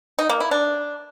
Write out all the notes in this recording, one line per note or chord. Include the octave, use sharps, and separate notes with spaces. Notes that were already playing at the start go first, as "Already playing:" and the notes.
D#4
A#3
E4
D4